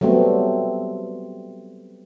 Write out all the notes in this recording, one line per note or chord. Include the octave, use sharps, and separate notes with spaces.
F#3 G3 A3 B3 C4